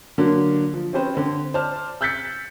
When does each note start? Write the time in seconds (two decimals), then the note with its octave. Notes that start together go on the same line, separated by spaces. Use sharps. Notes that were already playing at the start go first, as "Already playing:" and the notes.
0.18 D3 F#3 A#3 D4
0.74 F3
0.93 C4 C#4 G4 B4 C5
1.15 D3 C4
1.54 C5 D5 A5 F6
2.01 E6 F#6 G6 A6 B6 C#7